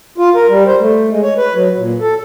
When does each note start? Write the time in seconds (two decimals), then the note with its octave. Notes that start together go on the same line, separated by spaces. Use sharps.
0.18 F4
0.35 A#4
0.49 G3
0.67 C5
0.79 A3
1.10 G#3
1.23 C#5
1.38 B4
1.54 F#3
1.77 A#2
2.01 A4